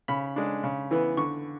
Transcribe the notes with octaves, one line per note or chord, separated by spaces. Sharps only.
C#3 B5
G#3 D4
C#3
E3 B3
D3 C#6